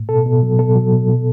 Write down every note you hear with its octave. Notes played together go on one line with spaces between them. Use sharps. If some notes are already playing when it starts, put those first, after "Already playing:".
Already playing: A2
B2 A4
B2
F#3
B2 A4
F#3
B2
B2